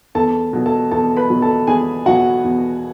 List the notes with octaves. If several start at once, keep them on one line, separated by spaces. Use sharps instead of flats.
E2 A4 A5
B2 F#3
A4 A5
E2 A4 A5
B4 B5
B2 F#3
A4 A5
E2 G#4 G#5
B2 F#3 F#4 F#5
E2